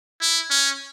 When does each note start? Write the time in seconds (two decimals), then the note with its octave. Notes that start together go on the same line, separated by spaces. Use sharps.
0.22 E4
0.51 C#4